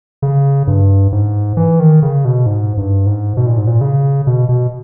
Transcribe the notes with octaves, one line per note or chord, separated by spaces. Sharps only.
C#3
G2
G#2
E3
D#3
C#3
B2
G#2
G2
G#2
B2
A#2
G#2
A#2
C#3
B2
B2